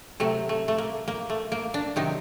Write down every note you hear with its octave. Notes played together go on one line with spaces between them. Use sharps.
C3 F#3 A3
A3
A3
A#3
A#3
A3
A#3
D4
C3 D#3 F#3 D#4